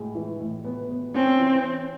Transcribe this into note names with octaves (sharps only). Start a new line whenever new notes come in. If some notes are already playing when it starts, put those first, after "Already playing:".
Already playing: A2 G#3
E3
A2
B3
B3
C4 C#4
E3